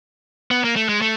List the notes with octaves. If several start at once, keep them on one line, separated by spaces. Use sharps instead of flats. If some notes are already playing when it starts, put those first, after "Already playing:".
B3
A#3
A3
G#3
A3